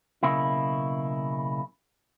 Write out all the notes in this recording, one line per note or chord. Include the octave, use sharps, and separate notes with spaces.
B1 C#3 A#3 E4